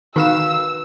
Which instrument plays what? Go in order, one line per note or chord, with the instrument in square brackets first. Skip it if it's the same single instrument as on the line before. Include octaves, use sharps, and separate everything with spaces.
[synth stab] D#3 F5 E7 [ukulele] F#4 B4 [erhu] E6